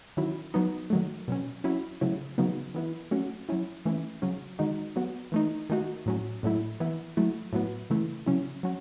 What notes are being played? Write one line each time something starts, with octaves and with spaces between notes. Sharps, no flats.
D#3 F#3 C#4 E4
F#3 B3 D#4
D#3 F#3 A3
B2 F#3 C#4
F#3 C#4 E4
C#3 F#3 A3 E4
C#3 F#3 B3 D#4
E3 B3 E4
F#3 A3 C#4 F#4
F#3 C#4 E4
E3 A3 C#4 E4
C#3 F#3 C#4
D#3 G#3 D#4 F#4
F#3 B3 F#4
E3 A3 D#4
D#3 A3 D#4 F#4
A2 F#3 C#4
A2 F#3 A3 E4
E3 B3 E4
F#3 A3 E4
A2 F#3 B3
C#3 E3 A3 E4
C#3 F#3 C#4 E4
F#3 C#4 F#4